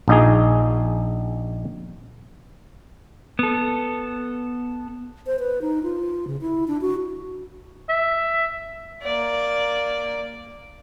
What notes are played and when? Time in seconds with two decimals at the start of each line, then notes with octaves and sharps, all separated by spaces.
0.08 A#1 D#4 G#4
3.39 B3 A4
5.27 C5
5.39 B4
5.62 D#4
5.83 F4
6.27 C#3
6.41 E4
6.68 D4
6.81 F#4
7.89 E5
9.03 A#3 D5